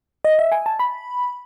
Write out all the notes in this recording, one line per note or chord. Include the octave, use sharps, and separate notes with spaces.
D#5
E5
G#5
A5
B5